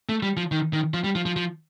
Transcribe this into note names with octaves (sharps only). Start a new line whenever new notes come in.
A3
G3
F3
D#3
D#3
F3
G3
F3
F3
F3